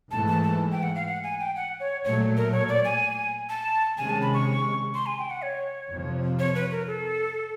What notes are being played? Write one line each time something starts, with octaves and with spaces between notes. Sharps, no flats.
G#2 E3 A3 A5
A5
A5
G5
F#5
F5
F#5
G#5
G5
F#5
C#5
A#2 F#3 A3 C#5
A#4
C#5
D5
G#5
A5
C3 D#3 G#3 C#4 G#5
A5
B5
C#6
C6
G#5
G5
F#5
C#5
F2 C3 F3
C#5
B4
A#4
A4